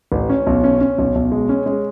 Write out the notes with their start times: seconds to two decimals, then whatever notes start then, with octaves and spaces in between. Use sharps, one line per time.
0.12 A1
0.29 C#4
0.47 B1
0.64 C#4
0.81 C#4
0.98 B1
1.15 B1
1.32 G#3
1.49 C#4
1.66 G#3